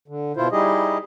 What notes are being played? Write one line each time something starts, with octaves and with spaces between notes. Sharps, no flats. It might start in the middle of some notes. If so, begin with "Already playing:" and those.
D3
B2 E4 F4 C5
G3 D#4 E4 G4 G#4 D#5